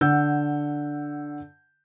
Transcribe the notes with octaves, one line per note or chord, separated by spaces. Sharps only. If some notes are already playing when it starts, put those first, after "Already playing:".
D3 F#5 E6 G6